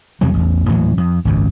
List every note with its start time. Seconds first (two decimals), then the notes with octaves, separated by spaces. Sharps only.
0.21 E2 C3 F#3 G3
0.34 A1 E2
0.68 D#1 A2 E3 F#3
0.98 F2
1.25 G#1 C#2 F#2